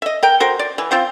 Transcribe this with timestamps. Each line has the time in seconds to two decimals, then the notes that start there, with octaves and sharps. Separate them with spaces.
0.02 D#5 E5
0.23 A#4 G5
0.40 F#4 A#4 C5
0.59 D5
0.78 E3
0.91 C4 F4 C5 G5